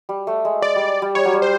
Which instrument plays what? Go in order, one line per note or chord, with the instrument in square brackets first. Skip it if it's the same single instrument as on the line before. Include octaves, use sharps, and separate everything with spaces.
[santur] G3
A3
G#3
[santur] G#3 [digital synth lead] D5
[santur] G3
G3
[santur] G3 [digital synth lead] C#5
[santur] F#3
G3
[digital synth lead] C5